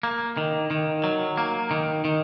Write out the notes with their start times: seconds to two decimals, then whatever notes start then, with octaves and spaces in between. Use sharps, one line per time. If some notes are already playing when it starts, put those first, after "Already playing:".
0.03 A#3
0.37 D#3
0.70 D#3
1.04 F#3
1.37 A#3
1.71 D#3
2.05 D#3